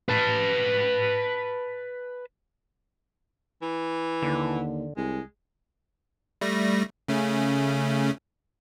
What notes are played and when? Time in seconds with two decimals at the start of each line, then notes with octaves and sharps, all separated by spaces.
0.09 B4 A5
3.62 E3
4.23 D#2 D3
4.97 C2 G#3
6.41 G3 A3 A#6
7.08 C#3 A3 C#4